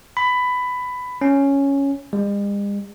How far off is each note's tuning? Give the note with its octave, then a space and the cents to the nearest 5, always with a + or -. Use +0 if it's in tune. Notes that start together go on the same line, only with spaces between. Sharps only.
B5 +15
C#4 +0
G#3 -45